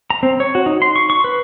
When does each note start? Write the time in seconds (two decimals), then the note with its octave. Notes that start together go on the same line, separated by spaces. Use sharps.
0.10 A#5
0.23 C4
0.40 C#5
0.55 F#4
0.66 D#4
0.82 C6
0.96 C#6
1.10 C#6
1.24 B4